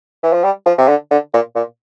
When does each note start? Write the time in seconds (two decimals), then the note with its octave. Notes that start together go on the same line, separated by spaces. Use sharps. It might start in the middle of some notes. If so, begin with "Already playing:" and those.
0.23 E3
0.33 F3
0.44 G3
0.66 F3
0.78 C3
0.88 D3
1.11 D3
1.33 A#2
1.55 A#2